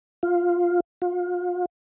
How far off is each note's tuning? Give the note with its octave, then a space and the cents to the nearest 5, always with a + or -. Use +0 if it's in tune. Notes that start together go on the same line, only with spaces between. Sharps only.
F4 +5
F4 +35